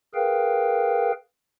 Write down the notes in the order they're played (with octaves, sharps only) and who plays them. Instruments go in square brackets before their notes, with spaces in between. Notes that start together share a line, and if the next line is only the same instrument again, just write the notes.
[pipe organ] G#4 A#4 B4 F5 G5